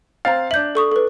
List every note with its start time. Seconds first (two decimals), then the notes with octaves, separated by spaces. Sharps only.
0.25 C4 F5 A#5 A6
0.51 D4 E5 G6 F#7
0.75 A4 C#6 D#6
0.92 A4 B4